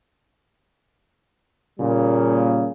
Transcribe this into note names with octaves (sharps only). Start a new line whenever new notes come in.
A#2 C#3 G3 A#3